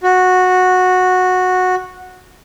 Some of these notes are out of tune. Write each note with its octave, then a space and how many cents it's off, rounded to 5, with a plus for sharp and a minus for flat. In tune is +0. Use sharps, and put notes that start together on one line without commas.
F#4 -10